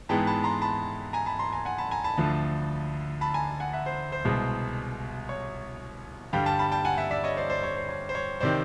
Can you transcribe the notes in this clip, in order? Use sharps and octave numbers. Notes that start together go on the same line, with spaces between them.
G#2 E3 G#3 B3 G5 A5
A5 B5
A#5 C6
A5 B5
G#5 A#5
A5 B5
A#5 C6
G#5 A#5
F#5 G#5
A5 B5
G#5 A#5
A5 B5
D2 D3 F3
A5 B5
G#5 A#5
F#5 G#5
E5 F#5
C5
C5
C2 B2 G#3
C#5
G2 D3 G3 F5 G5
G5 A5
A5 B5
G5 A5
F#5 G#5
E5 F#5
D5 E5
C#5 D#5
C5 D5
C5 D5
C#5
C5
C#5
C5
C#5
C3 D#3 C5 D5